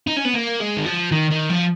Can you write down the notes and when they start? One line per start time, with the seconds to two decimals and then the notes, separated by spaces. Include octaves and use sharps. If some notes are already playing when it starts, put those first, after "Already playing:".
0.07 D#4
0.16 C#4
0.25 B3
0.34 A#3
0.60 G#3
0.77 D#3
0.86 F3
1.11 D#3
1.31 D#3
1.50 F3